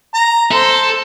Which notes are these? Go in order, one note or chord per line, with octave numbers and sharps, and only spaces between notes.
A#5
A4 C5